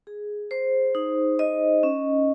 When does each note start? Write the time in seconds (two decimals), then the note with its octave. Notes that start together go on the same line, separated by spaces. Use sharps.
0.07 G#4
0.51 C5
0.95 D#4
1.39 D#5
1.83 C#4